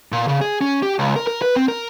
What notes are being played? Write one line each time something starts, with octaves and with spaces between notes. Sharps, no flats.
A#2
C#3
G#4
C#4
G4
C#2
A#4
A#4
B4
C4
A#4